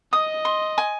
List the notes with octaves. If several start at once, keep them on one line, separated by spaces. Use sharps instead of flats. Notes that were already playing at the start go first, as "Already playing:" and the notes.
D#5 D#6
C6
G#5